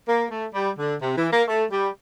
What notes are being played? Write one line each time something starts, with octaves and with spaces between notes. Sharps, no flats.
A#3
A3
G3
D3
C3
E3
A#3
A3
G3